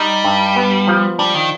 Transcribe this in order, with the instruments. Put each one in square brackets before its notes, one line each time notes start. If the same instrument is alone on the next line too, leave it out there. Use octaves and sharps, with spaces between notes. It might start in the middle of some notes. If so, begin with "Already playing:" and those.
Already playing: [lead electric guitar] G3 [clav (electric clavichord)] D#4
[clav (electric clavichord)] G2
B3
F3
[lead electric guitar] G3 [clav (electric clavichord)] D4
[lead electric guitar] D#3